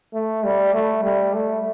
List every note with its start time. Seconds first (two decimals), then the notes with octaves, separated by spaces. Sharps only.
0.14 A3
0.44 G3
0.73 A3
1.03 G3
1.34 A3